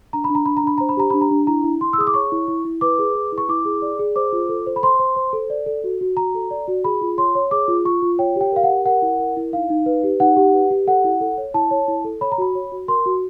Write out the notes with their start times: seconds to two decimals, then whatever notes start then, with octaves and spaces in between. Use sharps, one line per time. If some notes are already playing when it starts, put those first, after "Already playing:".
0.13 D4 A#5
0.24 B5
0.30 D4
0.35 A#5
0.46 D4 B5
0.57 A#5
0.63 D4 B5
0.78 C5 A#5
0.89 B5
0.97 G4 A#5
1.10 D4 B5
1.21 A#5
1.31 D4
1.47 E4 A#5
1.64 E4
1.81 E4 C6
1.93 E6
1.98 G#4 D#6
2.07 D6
2.14 C#5 C#6
2.32 E4
2.48 E4
2.65 E4
2.81 B4 D6
2.99 G#4
3.15 B4
3.32 E4
3.38 C#6
3.49 E4 D6
3.65 G#4
3.82 D5
3.99 G#4
4.16 C5 D6
4.32 F4
4.49 A4
4.67 C5
4.76 B5
4.83 C5 C6
4.99 C5
5.16 C5
5.33 A4
5.50 D5
5.66 A4
5.84 F#4
6.01 F#4
6.17 F#4 A#5
6.35 A4
6.51 D5
6.68 F#4
6.84 G#4 B5
7.01 F4
7.18 C#5 C6
7.35 C#5
7.51 G#4 D6
7.68 F4
7.85 F4 C#6
8.02 F4
8.19 C#5 G5
8.36 G4 G5
8.52 A#4 F5
8.63 F#5
8.69 G4
8.86 A#4 F#5
9.02 E4
9.20 A#4
9.36 E4
9.53 D#4 F5
9.70 D#4
9.86 B4
10.03 G4
10.20 D#4 F#5
10.37 G4
10.53 B4
10.71 G4
10.87 A4 F#5
11.04 E4
11.21 A4
11.38 C#5
11.54 E4 A5
11.71 C#5
11.88 E4
12.04 A4
12.21 C#5 B5
12.32 A#5
12.38 F#4 B5
12.55 C#5
12.72 F#4
12.88 A#4 C6
13.06 F#4